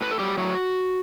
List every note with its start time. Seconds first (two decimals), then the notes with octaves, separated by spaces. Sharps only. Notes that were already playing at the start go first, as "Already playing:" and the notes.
0.01 A2 B4
0.11 A4
0.19 F#3 G3 G4
0.37 A2 F#3 F#4